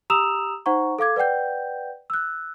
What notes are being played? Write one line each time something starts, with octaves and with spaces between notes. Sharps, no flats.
G4 A#5 D#6 E6 E7 F7
D#4 C5 F#5 A#5 C#6
A4 F5 D6 G#6
B4 D5 F#5 G5 G6
E6 F#6